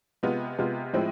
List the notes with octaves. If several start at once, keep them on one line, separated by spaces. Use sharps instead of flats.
C3 G#3 B3 F4
C3 G#3 B3 F4
A2 F3 G#3 C4 E4